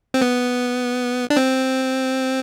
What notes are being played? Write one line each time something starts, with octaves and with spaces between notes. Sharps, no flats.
C4
B3
D4
C4